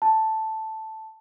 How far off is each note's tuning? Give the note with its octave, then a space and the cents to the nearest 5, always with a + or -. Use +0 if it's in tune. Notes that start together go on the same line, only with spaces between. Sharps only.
A5 +0